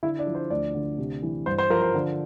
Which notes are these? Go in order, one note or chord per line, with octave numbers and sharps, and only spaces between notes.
D3 E4 E5
D4 D5
F3
C5
D2 D4 D5
D3
C3
E3
G2 C5
C5
F3 A#4
C5
D3